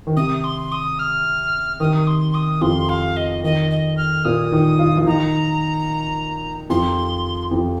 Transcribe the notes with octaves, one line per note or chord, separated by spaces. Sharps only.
D#3
C3 D#6
C6
D#6
F6
D#3 D#6
C6
D#6
F2 F3 C6
F5
D#5
D#3 D#5
D#5
F6
A#2 A#3 D#6
D#3 D#4
F4
F3 F4
D#3 D#4 A#5
F2 F3 C6
F2 F3